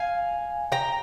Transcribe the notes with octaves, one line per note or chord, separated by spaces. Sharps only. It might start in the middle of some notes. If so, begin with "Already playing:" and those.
Already playing: F5 G#5
G5 A#5